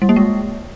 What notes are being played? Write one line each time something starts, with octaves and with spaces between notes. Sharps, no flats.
G3
A#3
G#3